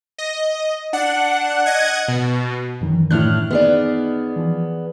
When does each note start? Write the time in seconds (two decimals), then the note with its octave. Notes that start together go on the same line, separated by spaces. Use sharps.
0.18 D#5
0.93 D4 F#5
1.66 D#5 F#5 G#6
2.08 B2
2.81 F#2 D#3 E3
3.11 A2 D4 E4 F6 F#6
3.51 B3 D#4 G#4 D5
4.36 E3 F3